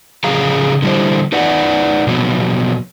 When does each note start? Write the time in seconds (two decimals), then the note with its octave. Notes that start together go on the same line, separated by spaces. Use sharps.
0.24 C#3 F3 G#4 F5 A#5
0.82 D3 G3 E4 C5
1.32 D#4 B4 D5 F#5
2.07 B2 F3 F#3 B3